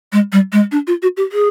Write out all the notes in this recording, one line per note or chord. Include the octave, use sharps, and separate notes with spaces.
G#3
G3
G#3
D4
F4
F#4
G4
G#4